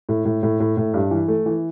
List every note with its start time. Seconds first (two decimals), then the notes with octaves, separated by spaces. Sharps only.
0.09 A2
0.25 A2
0.43 A2
0.60 A2
0.77 A2
0.94 G2
1.11 E3
1.28 A3
1.46 E3